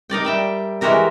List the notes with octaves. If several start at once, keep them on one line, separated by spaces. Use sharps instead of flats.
D#4 A#4 D5 G5
G3 E5 G5
E3 G#3 F#4 G4 A#4 A#5